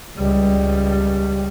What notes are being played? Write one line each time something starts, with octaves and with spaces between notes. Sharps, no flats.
C#2 G3